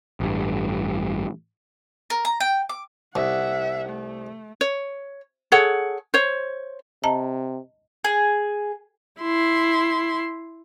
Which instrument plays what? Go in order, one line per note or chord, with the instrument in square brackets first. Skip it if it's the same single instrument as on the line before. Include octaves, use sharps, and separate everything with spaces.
[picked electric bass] A1 G2
[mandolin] A#4
A#5
G5
D6
[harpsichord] C2 [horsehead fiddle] E5 F#5
[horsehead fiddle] A3
[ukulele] C#5
G#4 A4 C#5 F#5
C5 C#5
[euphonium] C3 [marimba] D#5 A5 A#5
[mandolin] G#4
[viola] E4 C6